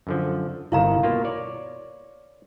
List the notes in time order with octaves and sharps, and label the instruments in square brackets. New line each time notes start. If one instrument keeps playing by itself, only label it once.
[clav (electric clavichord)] F#2 D3 F3
[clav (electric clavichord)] G1 C2 D#3 [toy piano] E4 F5 A#5
[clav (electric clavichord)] B2 A#3 F4
C#5 D5